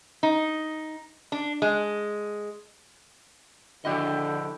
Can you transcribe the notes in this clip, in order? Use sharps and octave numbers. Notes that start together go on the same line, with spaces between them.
D#4
D4
G#3
D3 F3 D4 E4 F#4 G4 A4 D#5